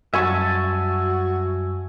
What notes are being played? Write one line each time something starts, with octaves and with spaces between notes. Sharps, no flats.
F#2 G3 F#4 E5 G#5 A5 C#6